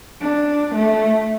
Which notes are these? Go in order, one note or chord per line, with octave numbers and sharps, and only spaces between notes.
D4
A3